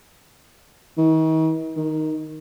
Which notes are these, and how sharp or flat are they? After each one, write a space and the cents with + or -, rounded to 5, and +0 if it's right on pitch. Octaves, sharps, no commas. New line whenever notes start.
D#3 +45
D#3 +5